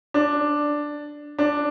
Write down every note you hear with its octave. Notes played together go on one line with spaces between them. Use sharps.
D4
D4